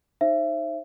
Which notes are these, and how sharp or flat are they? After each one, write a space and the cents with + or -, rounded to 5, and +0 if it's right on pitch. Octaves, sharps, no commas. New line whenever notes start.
D#4 +0 C5 +25 E5 +30